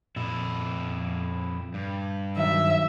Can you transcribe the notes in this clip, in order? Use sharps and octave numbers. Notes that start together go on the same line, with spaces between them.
F2 A#2 E4
G2
D#3 F#3 E5